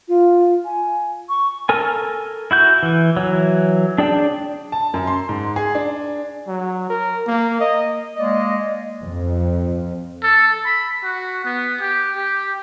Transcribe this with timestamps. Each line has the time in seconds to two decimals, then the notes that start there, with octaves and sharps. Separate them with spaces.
0.09 F4
0.65 G#5
1.29 C#6
1.69 A4 A#4 G#5
2.51 E4 F#4 G6
2.83 E3
3.17 E3 F#3
3.98 D4 G#4 D5 G5 A5
4.72 A5
4.94 F#2
5.07 C6
5.29 G#2
5.56 G#4
5.75 D4
6.48 F#3
6.90 A#4
7.27 A#3
7.60 D#5
8.17 G#3 A#3 D5 D#5
9.04 F2
10.23 A4
10.66 B5
11.04 F#4
11.45 B3
11.81 G4
12.16 G4